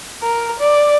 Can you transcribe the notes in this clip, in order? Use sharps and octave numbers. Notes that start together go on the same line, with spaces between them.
A#4
D5